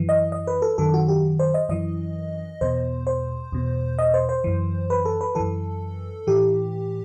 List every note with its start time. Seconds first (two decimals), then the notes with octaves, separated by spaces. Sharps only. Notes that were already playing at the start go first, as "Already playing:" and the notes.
Already playing: F#2 E3
0.09 D#5
0.32 D#5
0.47 B4
0.62 A4
0.78 F#2 D#3 A4
0.94 F#4
1.08 G4
1.39 C5
1.54 D#5
1.69 F#2 E3 D#5
2.61 E2 B2 C5
3.07 C5
3.52 E2 B2
3.99 D#5
4.14 C5
4.29 C5
4.44 F#2 E3
4.90 B4
5.05 A4
5.21 B4
5.35 F#2 E3 A4
6.27 A2 E3 G4